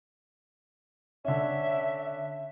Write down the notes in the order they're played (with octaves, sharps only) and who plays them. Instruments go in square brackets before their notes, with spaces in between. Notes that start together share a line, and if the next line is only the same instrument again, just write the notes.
[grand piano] D3 C#4 [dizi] E5